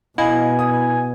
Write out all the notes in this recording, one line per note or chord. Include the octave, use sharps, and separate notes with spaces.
B2 E4 D#5 F5 G#5
D#6